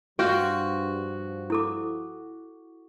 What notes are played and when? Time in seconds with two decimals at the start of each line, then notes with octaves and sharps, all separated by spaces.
0.19 G2 F3 F4 F#4 G5
1.50 E4 A4 D6